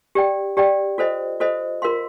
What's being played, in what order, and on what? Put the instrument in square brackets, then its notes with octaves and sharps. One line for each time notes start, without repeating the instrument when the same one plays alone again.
[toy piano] G4 D5 G5
G4 D5 G5
F4 A4 C5 D#5
F4 A4 C5 D#5
F4 A#4 F5 C6